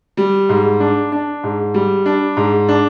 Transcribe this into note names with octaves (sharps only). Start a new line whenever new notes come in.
G3
G#2
D4
D4
G#2
G3
D4
G#2
D4